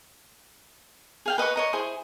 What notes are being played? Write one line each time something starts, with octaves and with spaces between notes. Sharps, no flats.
G#4 F5 G5
B4 D#5 B5 C#6
C#5 D#5 A#5
E4 G#4 C5 C6